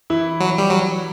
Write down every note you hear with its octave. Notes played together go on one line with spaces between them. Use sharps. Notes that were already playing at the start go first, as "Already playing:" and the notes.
E3 E4
F#3
G3
F#3